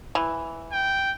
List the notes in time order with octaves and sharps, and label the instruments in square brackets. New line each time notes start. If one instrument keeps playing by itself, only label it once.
[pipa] E3
[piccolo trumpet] G5